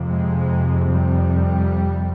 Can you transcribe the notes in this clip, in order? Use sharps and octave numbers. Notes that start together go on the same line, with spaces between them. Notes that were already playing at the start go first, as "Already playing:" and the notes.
Already playing: F2 C3
G#3
G3